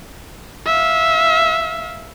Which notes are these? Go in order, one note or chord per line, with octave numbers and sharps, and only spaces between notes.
E5 F5